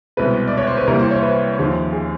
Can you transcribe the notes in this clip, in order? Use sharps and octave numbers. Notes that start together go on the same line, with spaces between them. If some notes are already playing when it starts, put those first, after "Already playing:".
C2 B2 G#3 B4
D5
C#5
C5
B4
C2 C3 E3 G3 A#3 A#4
C5
C#5
C5
B4
D#2 C#3 F3
G#4